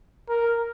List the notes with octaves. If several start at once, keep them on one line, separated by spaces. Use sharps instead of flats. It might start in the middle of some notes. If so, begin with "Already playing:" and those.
A#4